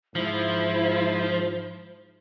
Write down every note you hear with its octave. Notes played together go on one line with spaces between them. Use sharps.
G#2 F3 E4 C5